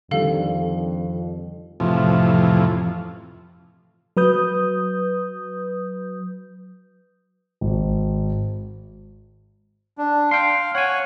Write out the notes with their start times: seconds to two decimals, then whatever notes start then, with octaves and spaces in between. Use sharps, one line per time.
0.11 F2 D3 D#3 G3 A4 F5
1.80 F2 A2 C3 E3 F3
4.17 F#3 B4 D#6 G6
7.61 G#1
9.98 D4
10.31 F5 G5 C6
10.75 C#5 F#5 G#5